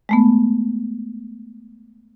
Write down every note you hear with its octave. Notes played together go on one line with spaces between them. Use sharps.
G#3 A3 B3